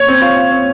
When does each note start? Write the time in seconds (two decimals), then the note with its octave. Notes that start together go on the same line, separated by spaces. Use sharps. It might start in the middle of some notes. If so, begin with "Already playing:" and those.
Already playing: C#5
0.08 C4
0.22 F4
0.37 F4
0.52 C4